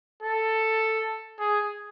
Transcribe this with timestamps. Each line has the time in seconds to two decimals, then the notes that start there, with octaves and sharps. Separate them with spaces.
0.23 A4
1.39 G#4